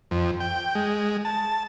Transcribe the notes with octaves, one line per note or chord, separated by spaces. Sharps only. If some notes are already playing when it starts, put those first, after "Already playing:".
F2
G5
G#3
A5